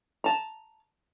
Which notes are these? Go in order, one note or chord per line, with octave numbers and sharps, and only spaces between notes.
A5 A#5